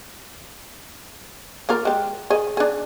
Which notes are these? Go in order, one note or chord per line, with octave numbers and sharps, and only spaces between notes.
A#3 F4 A#4
G#3 G4
G#4 D#5
D4 G#4